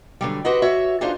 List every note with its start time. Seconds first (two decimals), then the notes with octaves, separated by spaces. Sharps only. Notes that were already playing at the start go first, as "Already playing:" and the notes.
0.21 D3 F#3 G3
0.45 F#4 G4 B4 C5 D#5 F#5
0.62 F#4 C#5 E5
1.01 D4 D#4 F4 F#4 G#4 C5